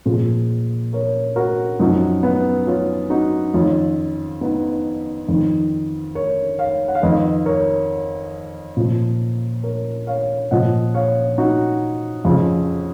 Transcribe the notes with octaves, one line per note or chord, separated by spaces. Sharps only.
A#2 F3 F4 G#4
A#4 C#5
F#4 A#4
F#2 F3 D#4 F#4
B3
C#4 F4
D#4 F#4
F2 D#3 C#4 F4
B3 D#4
F2 D#3
A#4 C#5
C#5 F5
F#5
F5
F2 D#3 B4 D#5
A#4 C#5
A#2 F3
A#4 C#5
C#5 F5
A#2 F3 D#5 F#5
C#5 F5
D#4 F#4
F2 C#3 F3